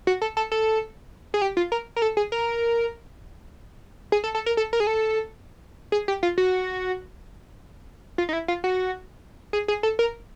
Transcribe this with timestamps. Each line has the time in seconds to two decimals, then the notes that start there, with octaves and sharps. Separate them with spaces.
0.07 F#4
0.22 A4
0.37 A4
0.52 A4
1.34 G#4
1.42 G4
1.57 F4
1.72 A#4
1.96 A#4
2.02 A4
2.17 G#4
2.32 A#4
4.12 G#4
4.24 A4
4.35 A4
4.46 A#4
4.57 A4
4.73 A#4
4.80 G#4
4.87 A4
5.92 G#4
6.08 G4
6.23 F4
6.38 F#4
8.18 F4
8.29 D#4
8.33 E4
8.48 F4
8.64 F#4
9.53 G#4
9.68 G#4
9.83 A4
9.99 A#4